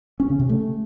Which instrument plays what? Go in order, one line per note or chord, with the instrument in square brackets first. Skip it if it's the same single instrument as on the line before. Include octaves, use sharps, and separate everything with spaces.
[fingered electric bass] C#4
C#3
C3
A3